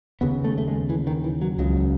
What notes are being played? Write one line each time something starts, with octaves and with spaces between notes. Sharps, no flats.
D#2 C#3 B3
A3
A3
G#3
E3
D#3
E3
F#3
C#2 C#3 F#3